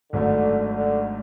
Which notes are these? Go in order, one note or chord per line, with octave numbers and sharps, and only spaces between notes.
G#1 G#2 D3 F#3 A3
D3